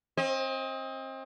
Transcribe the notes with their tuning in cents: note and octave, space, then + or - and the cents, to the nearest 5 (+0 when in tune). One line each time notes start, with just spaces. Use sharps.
C4 +30 D#5 +25